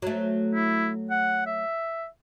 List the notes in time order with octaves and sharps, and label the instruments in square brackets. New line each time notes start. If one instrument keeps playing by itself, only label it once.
[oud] F#3 A3
[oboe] E4
F#5
E5